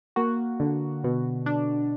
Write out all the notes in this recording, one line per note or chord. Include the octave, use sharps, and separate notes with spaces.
A#3 F#4
D3
B2
D4